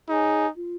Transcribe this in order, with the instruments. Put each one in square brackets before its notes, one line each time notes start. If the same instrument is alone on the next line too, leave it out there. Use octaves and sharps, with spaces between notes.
[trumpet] D#4 [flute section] G#4 C#5 G#5
[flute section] F4